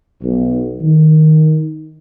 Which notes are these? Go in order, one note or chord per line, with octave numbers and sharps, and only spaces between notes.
B1
D#3